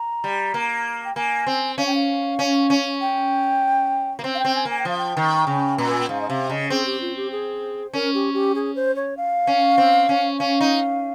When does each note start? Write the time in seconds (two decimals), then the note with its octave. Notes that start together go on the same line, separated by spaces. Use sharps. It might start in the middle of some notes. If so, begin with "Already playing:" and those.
Already playing: A#5
0.24 G3
0.54 A#3
1.04 G5
1.16 A#3 G#5
1.47 C4
1.78 C#4 F5
1.87 G5
1.95 F5
2.39 C#4
2.70 C#4
3.01 G5
4.19 A#3
4.24 C4
4.35 F5
4.39 G5
4.45 C4
4.55 G#5
4.65 A#3
4.70 G#5
4.79 G5
4.85 F3 F5
4.98 G5
5.17 D#3
5.47 C#3
5.78 A#2 A#5
5.90 G#5
5.99 G5
6.09 G#2 F5
6.21 D#5
6.29 C3 F5
6.50 C#3 D#5
6.70 C4 G#4
6.86 G4
7.01 F4
7.16 G4
7.32 G#4
7.94 C#4 A#4
8.14 G4
8.34 G4
8.55 G#4
8.76 C5
8.96 C#5
9.17 F5
9.47 C#4
9.78 C4
10.09 C#4
10.39 C#4 F5
10.61 D#4